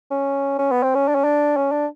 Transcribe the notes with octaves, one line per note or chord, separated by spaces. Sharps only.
C#4
C#4
B3
C4
C#4
D4
C#4
D4
C#4
D4